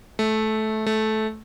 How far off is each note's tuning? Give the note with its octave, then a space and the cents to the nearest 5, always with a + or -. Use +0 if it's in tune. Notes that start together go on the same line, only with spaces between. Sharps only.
A3 -15
A3 -15